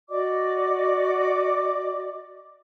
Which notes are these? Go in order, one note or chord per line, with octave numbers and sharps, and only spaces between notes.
F#4 D5 D#5 D6